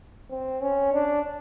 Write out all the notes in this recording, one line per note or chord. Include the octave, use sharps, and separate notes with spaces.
C4
C#4
D4